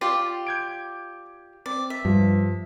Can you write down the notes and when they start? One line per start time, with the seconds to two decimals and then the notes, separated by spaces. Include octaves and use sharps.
0.01 F4 G4 D5
0.47 G6 G#6 D7
1.66 C4 D5
1.90 E5
2.05 G2 F3